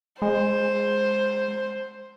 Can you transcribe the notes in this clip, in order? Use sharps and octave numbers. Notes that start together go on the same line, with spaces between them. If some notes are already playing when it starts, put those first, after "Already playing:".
G#3 C5